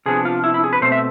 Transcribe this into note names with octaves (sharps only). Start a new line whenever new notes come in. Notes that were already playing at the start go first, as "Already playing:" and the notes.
C3 F3 B3 D4 G#4
F4
E4
E4
G#4
B4
B2 A3 C4 C5
E5